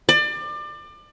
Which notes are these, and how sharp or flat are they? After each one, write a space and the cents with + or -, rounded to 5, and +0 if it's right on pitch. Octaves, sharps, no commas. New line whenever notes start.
D5 +30